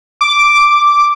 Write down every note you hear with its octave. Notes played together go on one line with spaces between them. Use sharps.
D6